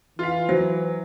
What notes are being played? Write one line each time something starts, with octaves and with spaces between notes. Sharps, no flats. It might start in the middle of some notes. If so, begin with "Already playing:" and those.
E3 F4 F5
F#3 C5